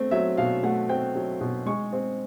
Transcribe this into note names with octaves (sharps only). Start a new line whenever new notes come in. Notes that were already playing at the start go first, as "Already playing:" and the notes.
Already playing: A3 C4
F#3 E5
B2 F5
A3 F#5
C4 G5
F#3
B2
G#3 C#6
C4